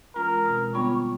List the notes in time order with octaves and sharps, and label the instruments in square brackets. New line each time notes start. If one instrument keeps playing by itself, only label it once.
[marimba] E3 G#3 C#4 F4 [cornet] A#4
[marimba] B2 G#3 C4
[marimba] D3 G3 B3 D4 F4 [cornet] C#5